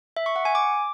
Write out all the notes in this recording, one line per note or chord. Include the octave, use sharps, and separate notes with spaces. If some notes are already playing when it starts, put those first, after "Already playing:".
E5
C#6
F#5
G#5
D6